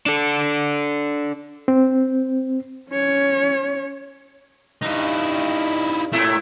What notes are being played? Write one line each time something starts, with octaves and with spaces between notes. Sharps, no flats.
D4 A4
C4
C#4 C#5
G2 D#4 E4
A2 A3 E4